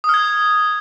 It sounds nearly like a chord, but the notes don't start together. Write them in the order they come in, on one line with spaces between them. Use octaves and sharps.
D#6 F6 G#6